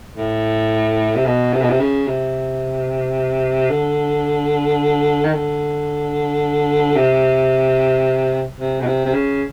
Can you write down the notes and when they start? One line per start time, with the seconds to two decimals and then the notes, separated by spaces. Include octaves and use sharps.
0.17 A2
1.16 C3
1.26 B2
1.53 C3
1.62 B2
1.70 C3
1.80 C#3
2.07 C3
3.70 D3
5.24 D#3
5.34 D3
6.96 C3
8.59 C3
8.80 B2
8.87 C3
9.05 C3
9.14 C#3